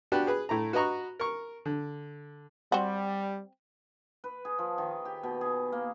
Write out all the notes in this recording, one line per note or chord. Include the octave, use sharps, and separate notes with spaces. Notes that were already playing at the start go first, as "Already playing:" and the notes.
B3 D4 F#4 G4 B4
G#4 B4
A2 A3 A#5
F#4 B4 D#5 A#5 C#6
A#4 C#6
D3
G3 C4 F#4
B4
G#4
F3
D#3
G4
B2
G#4
A#3